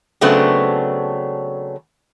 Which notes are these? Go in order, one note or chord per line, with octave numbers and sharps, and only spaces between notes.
C#3 F#3 A3 B3 C4 D4